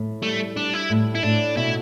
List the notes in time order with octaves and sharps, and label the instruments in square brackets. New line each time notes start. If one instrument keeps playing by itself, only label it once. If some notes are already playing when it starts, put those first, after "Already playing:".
Already playing: [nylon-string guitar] A2
[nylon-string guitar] G3 [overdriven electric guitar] A3
[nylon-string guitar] G3 [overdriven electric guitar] D4
[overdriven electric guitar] E4
[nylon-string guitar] A2
[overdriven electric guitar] E4
[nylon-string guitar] A2 [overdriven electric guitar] D4
[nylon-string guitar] B2 [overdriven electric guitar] E4